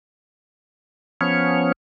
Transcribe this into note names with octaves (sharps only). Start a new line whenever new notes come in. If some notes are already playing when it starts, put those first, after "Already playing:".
F3 B3 C#4 C#5